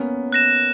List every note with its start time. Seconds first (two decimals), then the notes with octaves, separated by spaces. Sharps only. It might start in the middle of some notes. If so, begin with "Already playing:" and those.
Already playing: A#3 B3 C#4
0.32 F#6 A#6 E7